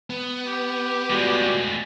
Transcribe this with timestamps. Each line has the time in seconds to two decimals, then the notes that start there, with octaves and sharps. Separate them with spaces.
0.10 B3
0.47 G4
1.10 A2 G3 G#3 F4 F#4